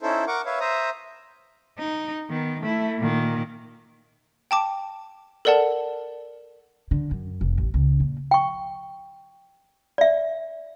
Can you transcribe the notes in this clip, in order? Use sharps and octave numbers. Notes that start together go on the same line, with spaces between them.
C#4 D#4 E4 A4 C5
A#4 F#5 C#6 D6
B4 C#5 E5 F5
C5 E5 A#5 D#6
D#4
D#3 B3
A3 E4
A#2 D#3
G5 A5 D6
A4 A#4 D5 F#5 A5
D3
F#2
F1
A1
C#2
A#2
G5 C#6
D5 E5